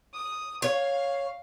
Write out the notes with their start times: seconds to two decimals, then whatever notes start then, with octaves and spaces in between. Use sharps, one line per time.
0.14 D#6
0.62 C#5 F5